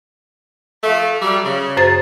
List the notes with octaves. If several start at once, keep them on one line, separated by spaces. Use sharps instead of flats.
F3 A3
F#3 G3
C#3
F#2 C5 A6